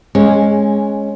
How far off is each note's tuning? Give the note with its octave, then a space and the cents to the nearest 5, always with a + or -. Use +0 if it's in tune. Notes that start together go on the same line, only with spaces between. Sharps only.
G#3 +5 C#4 -10